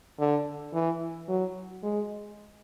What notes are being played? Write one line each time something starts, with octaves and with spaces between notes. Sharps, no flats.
D3
E3
F#3
G#3